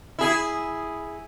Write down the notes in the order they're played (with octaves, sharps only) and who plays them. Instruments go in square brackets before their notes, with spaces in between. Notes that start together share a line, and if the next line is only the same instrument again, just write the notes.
[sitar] E4 G#4